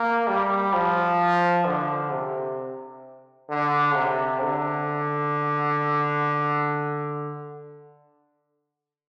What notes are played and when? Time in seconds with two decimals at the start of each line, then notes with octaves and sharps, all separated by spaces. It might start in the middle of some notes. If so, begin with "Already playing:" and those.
Already playing: A#3
0.27 G3
0.73 F3
1.65 D3
2.11 C3
3.49 D3
3.95 C3
4.41 D3